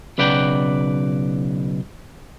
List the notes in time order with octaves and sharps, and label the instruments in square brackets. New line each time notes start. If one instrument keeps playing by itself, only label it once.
[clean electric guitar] B1 C#3 B4 D5 F#5 G5